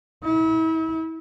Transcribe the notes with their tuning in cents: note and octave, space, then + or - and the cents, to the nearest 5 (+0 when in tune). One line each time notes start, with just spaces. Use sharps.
E4 -40